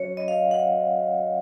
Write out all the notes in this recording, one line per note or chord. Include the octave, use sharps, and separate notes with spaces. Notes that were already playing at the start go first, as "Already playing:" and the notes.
Already playing: F#3 C#4 F#4 C#5
D#5
F5
F#5